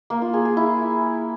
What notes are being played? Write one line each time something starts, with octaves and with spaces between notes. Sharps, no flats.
A#3
F4
G#4
G#4
E4